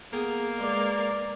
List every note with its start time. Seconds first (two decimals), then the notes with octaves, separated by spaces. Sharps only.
0.13 A#3 B3 G#4 G5
0.60 G#3 B4 D5